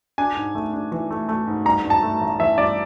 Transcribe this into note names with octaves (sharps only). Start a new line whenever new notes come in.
D4 G#5
G#2
A3
D4
E3
A3
A3
G#2
G2 A#5
G2
A5
A3
A1
E3 E5
G2 D5